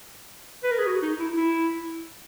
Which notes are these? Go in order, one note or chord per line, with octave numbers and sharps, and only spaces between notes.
B4
A#4
G#4
F#4
D#4
E4
E4